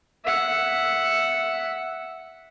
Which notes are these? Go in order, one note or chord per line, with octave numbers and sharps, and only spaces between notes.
E5 F#5